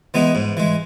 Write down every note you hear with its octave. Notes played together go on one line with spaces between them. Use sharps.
E3 G#3 B3 D#4
G#2
E3 G#3